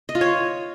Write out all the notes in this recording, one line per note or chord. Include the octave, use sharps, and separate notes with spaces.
D#5
F4
C#5